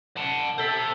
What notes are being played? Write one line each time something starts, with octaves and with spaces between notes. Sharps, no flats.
F#5 A5
A4 C5 E5